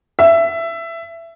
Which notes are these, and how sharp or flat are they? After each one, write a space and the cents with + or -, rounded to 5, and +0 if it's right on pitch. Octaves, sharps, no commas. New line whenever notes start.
E5 +15